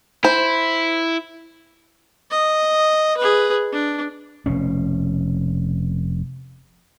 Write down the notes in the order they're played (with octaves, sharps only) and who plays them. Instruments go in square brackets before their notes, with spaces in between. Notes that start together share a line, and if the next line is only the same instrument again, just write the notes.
[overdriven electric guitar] E4 [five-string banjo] C5
[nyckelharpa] D#5
G#4 B4
D4
[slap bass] F1 B2 C#4